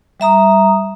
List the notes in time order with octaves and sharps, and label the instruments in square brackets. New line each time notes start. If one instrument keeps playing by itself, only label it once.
[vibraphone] G3 E5 A#5 D#6